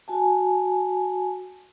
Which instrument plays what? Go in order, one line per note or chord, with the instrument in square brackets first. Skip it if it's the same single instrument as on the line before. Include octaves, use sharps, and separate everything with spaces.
[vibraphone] F#4 G#5 A5